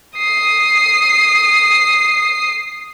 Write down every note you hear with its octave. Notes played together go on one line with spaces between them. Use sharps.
D#6 C7